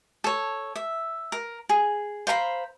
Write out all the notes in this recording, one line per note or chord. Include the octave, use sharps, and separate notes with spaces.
A4 C#5
E5
A#4
G#4
C5 F5 A#5 B5